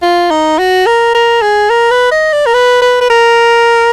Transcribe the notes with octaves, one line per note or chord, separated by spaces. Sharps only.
F4
D#4
F#4
A#4
A#4
G#4
A#4
B4
D#5
D5
A#4
B4
B4
B4
A#4